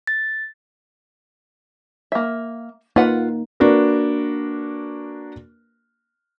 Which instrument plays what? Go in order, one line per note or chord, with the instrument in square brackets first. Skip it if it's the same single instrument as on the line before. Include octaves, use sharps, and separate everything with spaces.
[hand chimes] A6
[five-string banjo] A#3 E5
[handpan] A#3 D#4 [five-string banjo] F4 B4 F#5
[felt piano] A#3 D4 F#4 A#4 B4